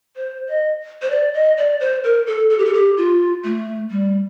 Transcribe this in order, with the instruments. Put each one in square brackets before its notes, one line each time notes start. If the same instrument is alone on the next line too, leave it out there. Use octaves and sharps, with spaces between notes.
[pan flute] C5
D#5
C5
D5
D#5
D5
C5
A#4
A4
A4
G4
A4
G4
F4
A3
G3